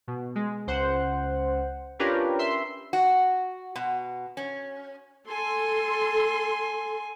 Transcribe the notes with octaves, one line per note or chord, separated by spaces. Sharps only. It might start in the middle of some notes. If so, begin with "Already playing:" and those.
B2
G#3
C#2 C5 F#5
C#4 D4 F4 G4 A#4 B4
E5 C6
F#4
B2
C#4
A4 G#5 C6